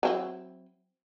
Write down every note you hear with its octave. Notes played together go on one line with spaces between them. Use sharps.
F#3 C4 E4